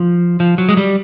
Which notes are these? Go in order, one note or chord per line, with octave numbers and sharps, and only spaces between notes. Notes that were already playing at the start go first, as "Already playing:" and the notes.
Already playing: F3
F3
F#3
G#3
G3